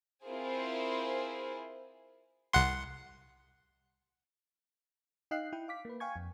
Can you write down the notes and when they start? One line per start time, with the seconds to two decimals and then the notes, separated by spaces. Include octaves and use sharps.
0.24 C4 E4 F4 G#4 A#4 C5
2.53 C2 F#5 C6
5.31 D#4 D#5 F5 G5 F#6 C7
5.53 E4 G5
5.68 F5 D6 B6
5.85 A#3 B4
6.00 F5 G5 G#5 C#6 G#6
6.16 F2